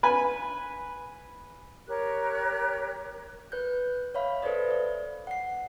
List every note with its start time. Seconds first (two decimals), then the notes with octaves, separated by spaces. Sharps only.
0.03 B4 G#5
1.87 G4 A#4 C#5 F#6
3.52 B4 F#6 G6
4.14 C#5 E5 F5 B5
4.42 A4 B4 C5 D5 D#5
4.71 D5
5.27 F#5 C7